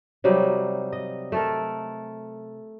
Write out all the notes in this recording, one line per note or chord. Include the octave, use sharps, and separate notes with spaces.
C3 F#3 G3 D#4
D#5
A3 A4 A#4